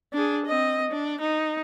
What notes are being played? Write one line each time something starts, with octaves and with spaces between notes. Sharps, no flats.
D4 G#4
C4 D#5
D4
D#4